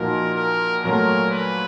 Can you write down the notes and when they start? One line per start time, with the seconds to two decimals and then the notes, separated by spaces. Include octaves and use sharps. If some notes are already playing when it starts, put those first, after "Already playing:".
Already playing: A#2 F3 A#3 D#4 F#4 A#4
0.35 A#4
0.84 A#2 F#3 A3 A#4
1.32 B4